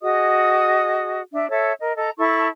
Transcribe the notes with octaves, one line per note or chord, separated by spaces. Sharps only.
F#4 G#4 D#5 D#6
D4 E5
A4 C#5 E5 E6
A#4 D#5
A4 D#5 A#5
E4 A4 A5 C#6